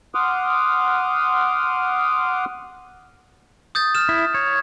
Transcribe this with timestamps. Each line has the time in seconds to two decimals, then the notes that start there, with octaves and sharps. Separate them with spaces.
0.15 F#5 C6 D6 D#6 F6
3.75 D#6 G6 A6
3.95 F6 E7
4.09 E4
4.34 C#5